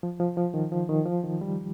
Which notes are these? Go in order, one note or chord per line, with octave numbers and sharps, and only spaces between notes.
F3
F3
F3
D#3
F3
D#3
F3
D#3
G3